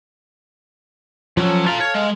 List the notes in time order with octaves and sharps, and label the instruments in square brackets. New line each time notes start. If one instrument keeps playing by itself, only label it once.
[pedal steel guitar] F3 C#4 A4 [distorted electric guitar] F#3
[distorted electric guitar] F4 A#5 [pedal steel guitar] A4 F5 A5
[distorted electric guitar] C#5
G#3